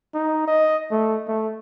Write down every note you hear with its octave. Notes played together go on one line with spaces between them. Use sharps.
D#4
D#5
A3
A3